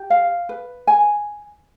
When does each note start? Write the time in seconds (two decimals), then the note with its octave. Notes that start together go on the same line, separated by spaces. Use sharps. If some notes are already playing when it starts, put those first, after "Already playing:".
Already playing: G4
0.10 F5
0.49 B4
0.87 G#5